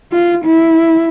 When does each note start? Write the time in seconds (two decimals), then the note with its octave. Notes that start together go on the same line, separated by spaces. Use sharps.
0.12 F4
0.45 E4